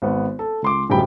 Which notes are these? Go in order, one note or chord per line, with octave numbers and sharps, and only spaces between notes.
G#1 B3
A4
C#2 C6 D6
D1 F#2 G3 G5 B5